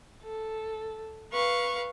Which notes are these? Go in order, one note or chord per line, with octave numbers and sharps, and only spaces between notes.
A4
B4 F5 C#6